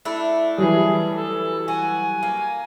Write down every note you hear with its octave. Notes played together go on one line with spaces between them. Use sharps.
A3 D4 E4
E3 F#3 G3 G#4
A4
F#4 G#5
A#3